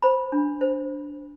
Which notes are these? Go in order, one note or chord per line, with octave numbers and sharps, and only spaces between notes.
C5 B5
D4
C5